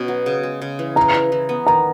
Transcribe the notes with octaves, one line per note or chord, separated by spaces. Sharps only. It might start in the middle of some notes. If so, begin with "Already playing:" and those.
Already playing: B2 C#4
F#3
C#3
G#3
C#3
E3
E3 A#5
E4
E3
B3
D#3 A#5